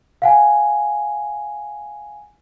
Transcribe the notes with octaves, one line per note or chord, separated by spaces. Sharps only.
F5 F#5 G#5